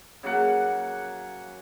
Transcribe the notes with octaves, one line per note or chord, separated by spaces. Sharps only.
C#3 F#3 A#3 F#5